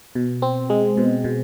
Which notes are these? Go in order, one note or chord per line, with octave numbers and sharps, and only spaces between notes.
B2
C4
G#3
B2
B2